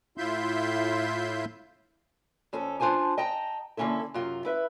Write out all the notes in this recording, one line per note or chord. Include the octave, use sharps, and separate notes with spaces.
A2 E4 F4 E5 C6 G6
F2 C#4 A4
D4 F4 C5 G#5 A5
D#5 G5 A5 A#5
D3 A#3 C#4 E4 A4
F#2 C3 F4
E4 B4 E5